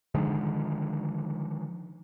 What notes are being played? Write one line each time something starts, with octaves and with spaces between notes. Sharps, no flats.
D3 D#3 F3 G#3